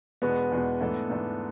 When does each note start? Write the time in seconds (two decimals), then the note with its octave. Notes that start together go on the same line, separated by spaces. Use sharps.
0.22 E2 B2 G#3 B3 D4 F#4
0.52 E2 B2 G#3 D4 F#4
0.81 G#2 E3 A3 D4 A4
1.10 G#2 E3 A3 D4 A4